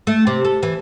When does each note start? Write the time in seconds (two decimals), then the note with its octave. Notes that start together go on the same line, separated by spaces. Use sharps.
0.07 A3
0.27 C3
0.45 A4
0.63 E3